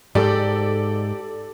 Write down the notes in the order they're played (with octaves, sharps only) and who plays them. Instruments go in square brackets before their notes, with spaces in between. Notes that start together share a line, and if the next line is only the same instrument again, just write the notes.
[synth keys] G#2 [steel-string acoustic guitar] G4 [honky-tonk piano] A4 D5